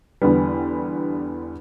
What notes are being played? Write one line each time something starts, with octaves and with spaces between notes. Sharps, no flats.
E2 D3 G3 B3